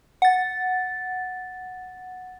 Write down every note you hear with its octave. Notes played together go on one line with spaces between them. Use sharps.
F#5 A6